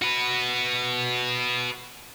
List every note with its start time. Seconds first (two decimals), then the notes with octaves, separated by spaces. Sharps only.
0.02 F#4 B4